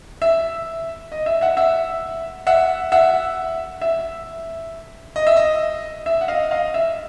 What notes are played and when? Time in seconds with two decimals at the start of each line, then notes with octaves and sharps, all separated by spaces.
0.22 E5
1.12 D#5
1.26 E5
1.41 E5 F#5
1.57 E5 F#5
2.47 E5 F#5
2.92 E5 F#5
3.82 E5
5.16 D#5
5.27 E5
5.36 D#5
6.06 E5
6.21 F#5
6.28 D#5 F5
6.51 D#5 F5
6.74 E5